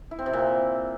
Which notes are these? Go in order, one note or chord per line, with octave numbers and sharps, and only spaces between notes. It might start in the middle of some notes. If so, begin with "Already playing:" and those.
E4
C4
C3
A#2